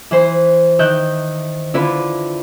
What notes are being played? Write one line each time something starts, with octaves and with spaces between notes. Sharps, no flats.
E3 C5
D#3 E5 F#6 G6
D3 E4 F4 B4